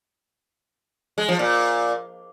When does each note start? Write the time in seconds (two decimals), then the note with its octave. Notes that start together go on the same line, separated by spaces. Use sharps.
1.18 G#3
1.28 F3
1.39 A#2